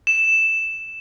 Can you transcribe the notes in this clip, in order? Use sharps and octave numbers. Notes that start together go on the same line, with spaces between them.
E7